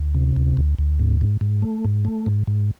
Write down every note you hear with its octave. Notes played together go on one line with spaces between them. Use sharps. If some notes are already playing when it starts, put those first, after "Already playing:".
Already playing: D2
C3
D2
D2
D2
G#2
G#2
G#2
A3
G#2
A3
G#2
G#2